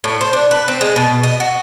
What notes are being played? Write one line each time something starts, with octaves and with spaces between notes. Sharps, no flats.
A2
C5
D4
B4
C4
G#3
B2
D#5
F#4